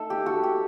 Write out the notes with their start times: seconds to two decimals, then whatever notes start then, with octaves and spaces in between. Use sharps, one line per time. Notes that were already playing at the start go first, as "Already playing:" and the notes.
Already playing: A3 D#4 A4
0.10 G4
0.26 F#4 A4
0.43 G4